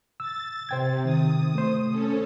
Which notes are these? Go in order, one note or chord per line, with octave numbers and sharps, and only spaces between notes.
E6 A6
C3 C5 G5 G#6
D#3 D#6
A3 C5
C#4 A4